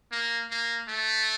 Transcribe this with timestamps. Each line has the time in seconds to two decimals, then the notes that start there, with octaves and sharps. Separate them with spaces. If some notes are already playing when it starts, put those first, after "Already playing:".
0.12 A#3
0.51 A#3
0.89 A3